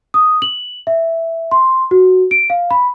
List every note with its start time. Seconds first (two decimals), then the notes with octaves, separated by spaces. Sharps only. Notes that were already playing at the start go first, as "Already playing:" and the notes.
0.14 D#6
0.42 F#7
0.87 E5
1.51 C6
1.91 F#4
2.31 D7
2.50 F5
2.71 B5